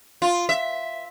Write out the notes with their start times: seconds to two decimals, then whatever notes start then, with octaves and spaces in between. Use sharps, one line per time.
0.22 F4
0.49 E5